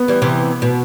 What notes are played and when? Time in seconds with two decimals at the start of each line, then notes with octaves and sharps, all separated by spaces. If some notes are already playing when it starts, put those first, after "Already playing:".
Already playing: B3
0.08 E3 G3
0.22 C3 E3
0.62 B2